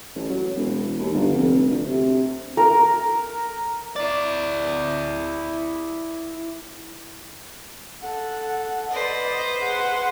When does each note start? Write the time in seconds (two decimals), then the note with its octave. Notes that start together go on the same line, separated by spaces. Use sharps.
0.15 A1
0.30 F#3
0.55 E1
0.99 D#2
1.14 G1
1.34 F1
1.68 D2
1.87 C3
2.57 A#4
3.96 E4 D5
8.02 A4 F#5
8.91 B4 C5 D5 D#5
9.28 D#5
9.63 G#4 F#5 C6